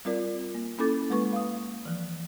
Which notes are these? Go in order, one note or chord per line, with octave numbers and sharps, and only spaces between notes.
G3 C4 F4 A#4 D5
A#3
A#3 C#4 E4 A4 D6 A6
G#3 A#3 B4 C#6
F5 D#6
E3 F3